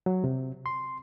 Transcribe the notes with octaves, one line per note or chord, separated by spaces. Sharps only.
F#3
C3
C6